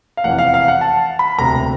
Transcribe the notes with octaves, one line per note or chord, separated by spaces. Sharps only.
F5
F1 E2 C3 E3 F#5
F5
F5
F#5
A5
B5
E1 D2 C3 A#5